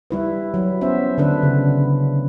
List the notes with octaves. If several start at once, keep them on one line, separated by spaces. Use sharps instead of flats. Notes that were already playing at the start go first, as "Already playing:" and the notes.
G3 E4 B4
F#3
B3 C#4 C5 E5
D3 D4 B4
C#3